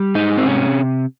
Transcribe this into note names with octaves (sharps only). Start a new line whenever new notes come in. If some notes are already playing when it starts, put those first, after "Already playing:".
Already playing: G3
G#2 D#4
C4
C3 C#4